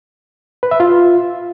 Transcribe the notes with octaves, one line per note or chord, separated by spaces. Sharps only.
B4
E5
F4